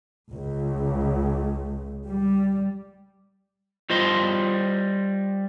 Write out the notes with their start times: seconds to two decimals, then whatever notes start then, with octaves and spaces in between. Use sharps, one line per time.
0.33 C#2
2.07 G3
3.90 G3 F4 C5 D#5 C6